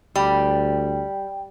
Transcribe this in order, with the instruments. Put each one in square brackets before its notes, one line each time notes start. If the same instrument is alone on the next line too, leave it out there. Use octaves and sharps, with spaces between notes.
[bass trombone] D2 [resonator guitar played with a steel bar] G3 [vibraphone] G5